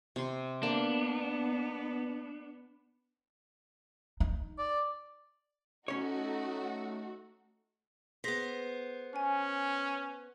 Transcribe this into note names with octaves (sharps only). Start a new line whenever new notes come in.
C3 C6
A#3 B3 D4
D#4
D5
A3 C#4 D#4 F#4 C#5
B3 G#4 C5 A#6 B6
C#4 G#5